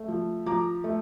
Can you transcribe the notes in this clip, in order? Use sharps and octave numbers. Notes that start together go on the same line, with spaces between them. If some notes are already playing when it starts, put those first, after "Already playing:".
Already playing: A3
F3
F3 A#5 D6
A3